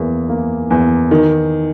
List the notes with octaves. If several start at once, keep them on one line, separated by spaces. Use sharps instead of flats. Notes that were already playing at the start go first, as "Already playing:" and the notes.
Already playing: E2 A#3
A#3
E2
D#3